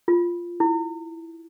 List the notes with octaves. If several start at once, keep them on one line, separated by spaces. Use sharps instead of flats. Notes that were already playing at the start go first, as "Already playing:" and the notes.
F4
E4